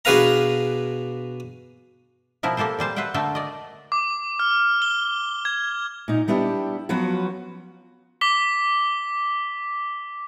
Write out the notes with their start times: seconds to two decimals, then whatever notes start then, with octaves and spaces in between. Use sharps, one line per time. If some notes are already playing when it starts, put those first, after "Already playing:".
0.05 B2 D4 G#4 B4 F5 A#5
2.43 B2 F3 E4 A#4
2.57 A#3 G4 A4 A#4 C5
2.79 A#2 G3 C5 A5
2.96 B4 C5 E5 F#5 G5
3.14 D3 A3 A4 A#4 G5 A5
3.35 D5 D#5
3.92 D6
4.39 F6
4.82 G7
5.45 G#6
6.08 A#2 D#4
6.28 G3 B3 D4 E4 G4
6.89 F3 F#3 B3 C#4 F#4
8.21 D6 B6 G7